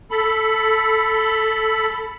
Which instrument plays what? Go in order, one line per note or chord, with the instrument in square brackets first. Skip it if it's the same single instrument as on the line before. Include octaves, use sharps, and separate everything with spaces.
[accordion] A4 B5